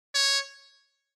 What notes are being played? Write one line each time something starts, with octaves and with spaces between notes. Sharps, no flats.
C#5